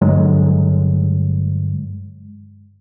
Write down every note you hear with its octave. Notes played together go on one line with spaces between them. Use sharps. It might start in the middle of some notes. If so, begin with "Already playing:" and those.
G2 D3 F#3 G#3